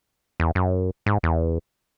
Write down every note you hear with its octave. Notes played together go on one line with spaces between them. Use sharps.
E2
F#2
G#2
E2